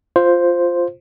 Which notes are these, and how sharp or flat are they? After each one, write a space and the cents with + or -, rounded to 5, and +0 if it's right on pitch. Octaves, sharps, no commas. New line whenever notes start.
F4 +0 C5 +0